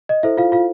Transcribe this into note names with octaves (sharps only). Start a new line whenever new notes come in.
D#5
E4 A4 C5 E5
F4 F5
F4 F5